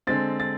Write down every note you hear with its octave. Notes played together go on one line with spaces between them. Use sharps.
D3 G#3 C4 A6
A6